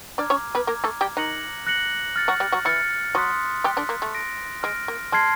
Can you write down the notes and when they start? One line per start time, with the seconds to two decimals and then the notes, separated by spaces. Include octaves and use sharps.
0.18 D4 D5 A#5 D6 F6 G#6
0.30 C#4 C#5
0.55 B3 B4
0.67 A#3 A#4 A#5 D6 F6 G#6
0.84 A3 A4
1.01 G3 G4
1.17 D#3 D#4 F#6 A#6 C#7 F#7
1.67 F#6 A#6 C#7 F#7
2.16 F6 A6 C#7
2.28 F#3 F#4
2.40 G3 G4
2.52 F#3 F#4
2.65 E3 E4 F6 A6 C#7
3.15 F#3 F#4 C6 D#6 F#6 B6
3.64 G3 G4 C6 D#6 F#6 B6
3.77 D3 D4
3.89 A#3
4.02 A3
4.14 F6 A#6 D7
4.63 G#3 F6 A#6 D7
4.88 A#3
5.12 G#3 A5 C6 F6 G#6 C7